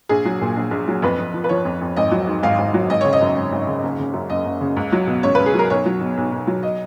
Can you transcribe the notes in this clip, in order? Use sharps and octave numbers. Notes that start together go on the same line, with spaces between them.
A#1 G#4
F#3
A#2
A#1
A#1
F#3
F2 B4
F2
F3
B4
F3 C#5
F2
F2
G#1 D#5
F#3
G#2
G#1 F5
G#1
F#3
G#1 D#5
C#5
C#3
D#5
F#2
G#1
G#1
C#3
F#1
C#3
F#2
F#1 D#5
F#1
C#3
C#2
F#3
B2
C#2 C#5
B4
C#2
G#4
F#3 A#4
B1 C#5
F#3
B2
B1
B1
F#3
D#5